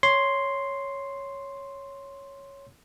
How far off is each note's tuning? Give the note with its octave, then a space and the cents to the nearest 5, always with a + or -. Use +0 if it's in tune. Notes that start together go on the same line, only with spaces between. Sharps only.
C#5 +0 C6 +0